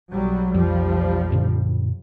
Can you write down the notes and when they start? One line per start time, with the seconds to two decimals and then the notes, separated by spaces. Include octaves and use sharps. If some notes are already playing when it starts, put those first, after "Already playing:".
0.11 B1 F#3 G3
0.54 B1 F2 F3 G3
1.32 F#2 A#2 D3